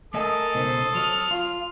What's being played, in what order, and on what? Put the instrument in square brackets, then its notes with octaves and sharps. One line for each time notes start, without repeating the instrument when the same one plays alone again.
[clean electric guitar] A3 D#5 G#5 [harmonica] A4 D#6 [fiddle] A#4
[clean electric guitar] C#2 B2 D#4 [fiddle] C5
[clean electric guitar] F#3 [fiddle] F6
[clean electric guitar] F4